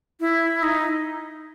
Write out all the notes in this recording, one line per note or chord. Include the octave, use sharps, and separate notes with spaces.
E4
D#4